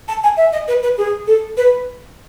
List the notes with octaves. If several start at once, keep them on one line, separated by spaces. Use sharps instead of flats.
A5
G#5
E5
D#5
B4
B4
G#4
A4
B4